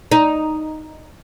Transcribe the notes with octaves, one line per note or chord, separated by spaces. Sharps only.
D#4